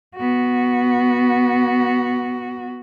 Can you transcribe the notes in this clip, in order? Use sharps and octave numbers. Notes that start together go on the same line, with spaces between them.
B3 F#4